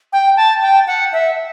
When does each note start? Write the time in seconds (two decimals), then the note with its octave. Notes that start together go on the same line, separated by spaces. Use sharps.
0.13 G5
0.37 A5
0.62 G5
0.87 F#5
1.13 E5